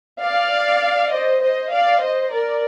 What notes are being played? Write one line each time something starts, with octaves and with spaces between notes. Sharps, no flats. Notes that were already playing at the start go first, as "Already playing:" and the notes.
D5 F5
C5 D#5
C5 D#5
D5 F5
C5 D#5
A#4 D5